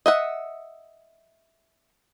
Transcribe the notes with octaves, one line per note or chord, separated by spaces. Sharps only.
D#5 E5 F#5